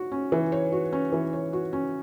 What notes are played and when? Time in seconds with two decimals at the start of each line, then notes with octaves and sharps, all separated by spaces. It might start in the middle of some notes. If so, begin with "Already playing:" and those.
Already playing: F#4
0.12 C#4
0.32 E3
0.52 C#5
0.72 F#4
0.92 C#4
1.12 E3
1.33 C#5
1.53 F#4
1.73 C#4